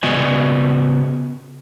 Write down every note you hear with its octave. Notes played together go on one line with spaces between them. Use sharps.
C#3 B3 F#4 D5 D#5 G#5